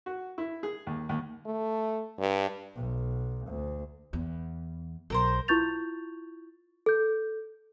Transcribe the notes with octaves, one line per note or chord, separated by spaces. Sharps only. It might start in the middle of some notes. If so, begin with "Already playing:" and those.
F#4
E4
G#4
D#2
D#2
A3
G2
B1
D2
E2
B1 A4 A#4 C5
E4 F4 C#6 G6 A6 F7
A4 G6